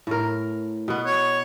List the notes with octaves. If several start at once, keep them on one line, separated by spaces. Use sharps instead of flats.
A2 A#4
B2 B3
C#5